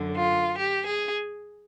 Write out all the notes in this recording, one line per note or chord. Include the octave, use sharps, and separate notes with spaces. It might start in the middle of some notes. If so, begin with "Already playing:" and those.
Already playing: F#2 D3
F4
G4
G#4